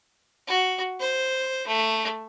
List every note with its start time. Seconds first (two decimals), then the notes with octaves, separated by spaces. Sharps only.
0.47 F#4
1.00 C5
1.67 A3